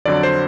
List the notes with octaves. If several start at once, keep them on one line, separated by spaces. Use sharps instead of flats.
F2 D3 F#3 D5
C5